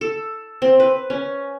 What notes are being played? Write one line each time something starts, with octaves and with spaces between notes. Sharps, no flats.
A4
C4
B4
C#4